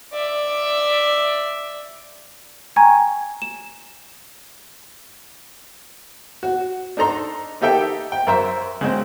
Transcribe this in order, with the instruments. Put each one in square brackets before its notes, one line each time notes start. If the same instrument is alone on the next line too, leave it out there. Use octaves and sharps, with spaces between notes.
[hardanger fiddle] D5 E5
[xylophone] G5 G#5 A#5 C#6 G#6
E7
[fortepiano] F#4
D4 D#4 A4 A#5 C6
A#3 D#4 G4 A4 E5 G5
G5
F#2 A#4 C5 E5
C#3 G#3 C4